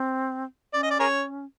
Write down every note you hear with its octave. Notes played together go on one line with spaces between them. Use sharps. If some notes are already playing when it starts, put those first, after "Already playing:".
Already playing: C4
C#4 D5
D#5
D5
G#4 A#4 C#5